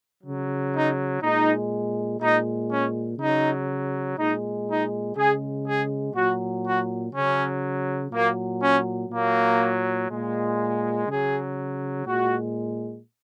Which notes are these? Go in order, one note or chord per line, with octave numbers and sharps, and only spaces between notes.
C#3 F#3
D#4
A#2 G#3 D#4
A#2 G#3 D#4
C#4
C#3 F#3 D#4
A#2 G#3 D#4
D#4
C#3 G#3 G#4
G#4
A#2 F#3 F#4
F#4
C#3 F#3 C#4
A#2 F#3 A#3
C#4
A#2 F#3 A#3
A#2 G#3
C#3 F#3 G#4
A#2 G#3 F#4